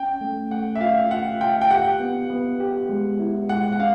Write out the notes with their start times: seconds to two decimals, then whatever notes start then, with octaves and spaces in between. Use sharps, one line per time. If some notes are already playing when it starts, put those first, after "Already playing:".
Already playing: C#4 G5
0.21 A3
0.51 A3 F#5
0.75 E5
0.81 F4 F5
1.10 F4 F#5
1.41 F4 G5
1.61 G5
1.71 G4 F#5
2.00 B3
2.30 B3
2.60 G4
2.89 G#3
3.19 E4
3.49 G#3 F#5
3.72 F#5
3.79 C#4 F5